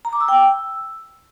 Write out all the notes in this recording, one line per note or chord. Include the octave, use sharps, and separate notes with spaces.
A#5
D6
E6
G5
E6